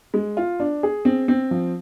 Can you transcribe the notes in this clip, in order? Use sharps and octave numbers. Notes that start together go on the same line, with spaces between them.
G#3
F4
D4
G#4
C4
C4
F3